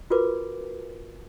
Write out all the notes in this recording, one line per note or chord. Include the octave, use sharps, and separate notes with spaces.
F4 F#4 A#4 B4 D6